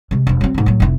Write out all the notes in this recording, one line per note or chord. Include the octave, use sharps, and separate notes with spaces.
C3 G#3
E1 F3
F#3 C4
G#2 F3
A2 F#3
F1 E4